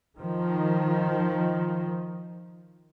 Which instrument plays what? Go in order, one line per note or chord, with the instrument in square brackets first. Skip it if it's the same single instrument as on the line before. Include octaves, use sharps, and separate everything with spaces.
[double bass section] D#3 F3